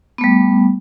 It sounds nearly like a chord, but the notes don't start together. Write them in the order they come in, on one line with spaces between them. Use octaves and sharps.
B3 A3 G3